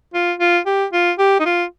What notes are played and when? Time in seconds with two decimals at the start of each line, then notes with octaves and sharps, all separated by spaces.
0.14 F4
0.40 F4
0.66 G4
0.93 F4
1.19 G4
1.40 D#4
1.45 F4